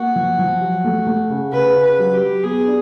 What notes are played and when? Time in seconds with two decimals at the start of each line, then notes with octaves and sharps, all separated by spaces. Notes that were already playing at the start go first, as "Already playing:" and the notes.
Already playing: A#3 F#4
0.16 F3
0.39 F3
0.61 F#3
0.84 A3
1.07 A3
1.30 C#3
1.52 C#3 B4
1.75 C#3
1.83 B4
1.99 F#3
2.14 G4
2.21 F#3
2.44 B3 G#4
2.67 D4